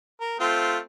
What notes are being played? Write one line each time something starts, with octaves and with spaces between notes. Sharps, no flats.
A#4
A3 C4 F4